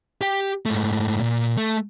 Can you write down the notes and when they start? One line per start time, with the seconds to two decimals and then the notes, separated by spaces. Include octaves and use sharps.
0.21 G4 G5
0.66 G#2 A3
1.20 A#2
1.57 A3